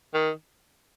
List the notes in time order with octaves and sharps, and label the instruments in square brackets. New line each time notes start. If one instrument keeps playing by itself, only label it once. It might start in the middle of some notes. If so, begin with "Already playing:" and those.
[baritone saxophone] D#3